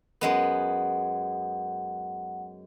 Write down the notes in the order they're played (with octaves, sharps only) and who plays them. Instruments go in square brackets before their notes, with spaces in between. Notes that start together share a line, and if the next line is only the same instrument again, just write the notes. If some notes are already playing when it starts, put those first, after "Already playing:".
[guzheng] F#2 G#3 B3 [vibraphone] F#5